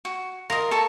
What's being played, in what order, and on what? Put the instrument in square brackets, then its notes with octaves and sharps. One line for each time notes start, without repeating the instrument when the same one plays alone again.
[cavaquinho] F#4
[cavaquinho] F4 D#5 [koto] A#4
[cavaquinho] A4 C#5 A5